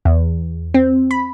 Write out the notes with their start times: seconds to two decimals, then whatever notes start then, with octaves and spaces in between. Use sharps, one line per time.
0.05 E2
0.74 C4
1.11 B5